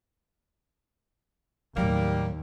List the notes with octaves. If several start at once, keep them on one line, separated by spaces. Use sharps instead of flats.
D#2 A2 F#3 G3 A#3